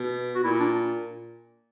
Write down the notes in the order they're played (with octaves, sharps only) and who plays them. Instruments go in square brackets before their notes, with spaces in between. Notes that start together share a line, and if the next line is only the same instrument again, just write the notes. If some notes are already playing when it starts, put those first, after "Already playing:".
Already playing: [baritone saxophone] B2
[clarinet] F#4
[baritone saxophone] A#2 [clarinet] E4
[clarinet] D4